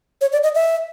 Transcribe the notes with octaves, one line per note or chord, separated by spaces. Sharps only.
C#5
D5
D#5
E5